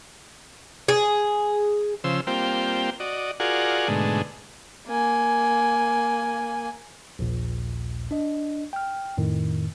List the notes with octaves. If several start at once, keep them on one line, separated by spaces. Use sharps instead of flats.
G#4
C#3 F3 C5 E6
G3 A#3 C4 F4 C5 G5
F#4 D5 D#5
F4 F#4 G#4 A#4 D5 F#5
G#2 B2 D3 G#3 A3
A#3 G#5
A#1 D#2 A#2
D4 D#5
G5 F6
F2 A2 D#3